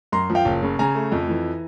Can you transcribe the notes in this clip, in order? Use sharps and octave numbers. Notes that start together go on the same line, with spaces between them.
F#2 A#5 C6
F3
F5 G5
F#1
C#3
C#3 G#5 A#5
A3
F2
E3